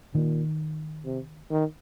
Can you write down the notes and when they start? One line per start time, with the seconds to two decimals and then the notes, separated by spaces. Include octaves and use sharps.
0.15 A#2 D#3
1.05 C3
1.50 D#3